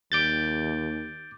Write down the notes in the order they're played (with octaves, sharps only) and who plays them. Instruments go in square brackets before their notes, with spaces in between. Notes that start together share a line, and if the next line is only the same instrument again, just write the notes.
[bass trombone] D#2 [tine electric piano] D6 G6 A6